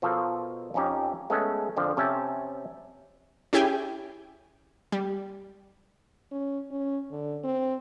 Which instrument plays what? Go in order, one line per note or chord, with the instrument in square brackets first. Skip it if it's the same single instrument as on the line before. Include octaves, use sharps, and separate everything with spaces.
[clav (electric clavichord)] B2 F3 F4 A4 A#4
F2 C4 C#4 D#4 G4
G#3 A3 B3 C#4 G#4 A4
F2 D3 F3
C3 C#4 E5 G5 A5
[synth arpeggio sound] C#4 E4 G4 G#4 G5 G#5
G3
[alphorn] C#4
C#4
D3
C4